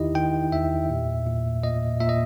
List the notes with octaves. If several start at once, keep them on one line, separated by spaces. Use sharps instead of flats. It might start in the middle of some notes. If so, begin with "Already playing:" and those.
Already playing: E2 D#3 D#4 E4 G4 D#5
D#3 G5
E2 E5
A#2
A#2
A#2 D#5
A#2 E5
D#5